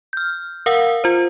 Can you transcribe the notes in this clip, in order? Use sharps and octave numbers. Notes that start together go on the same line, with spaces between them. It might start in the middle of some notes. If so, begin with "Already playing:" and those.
F6 G6
A#4 F5 F#5 E6
F4 C5